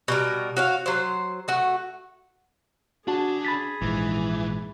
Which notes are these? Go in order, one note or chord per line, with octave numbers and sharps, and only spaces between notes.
B2 G3 A#4
F#4 C#5 F5
F#3 C5
A3 F#4
D3 D4 F#4 G#4 A5
B5 A6 B6
A#1 G#2 E3